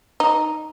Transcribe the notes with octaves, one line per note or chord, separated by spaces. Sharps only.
D#4